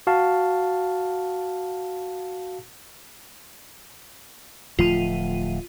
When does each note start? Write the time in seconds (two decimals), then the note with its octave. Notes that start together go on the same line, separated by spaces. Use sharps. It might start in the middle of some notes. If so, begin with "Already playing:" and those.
0.07 F#4 F5 A5
4.79 D1 F3 A3 F4 D#7